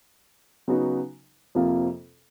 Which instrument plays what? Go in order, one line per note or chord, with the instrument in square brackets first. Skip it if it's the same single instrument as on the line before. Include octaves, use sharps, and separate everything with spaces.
[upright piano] C#3 F#3 B3 D#4 F#4
F2 C3 F3 A#3